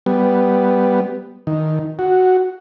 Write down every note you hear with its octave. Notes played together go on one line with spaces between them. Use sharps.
G3 B3
D#3
F#4